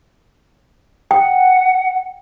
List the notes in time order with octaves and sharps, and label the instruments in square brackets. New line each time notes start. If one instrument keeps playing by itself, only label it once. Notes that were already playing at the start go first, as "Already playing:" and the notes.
[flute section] F#5 [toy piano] G5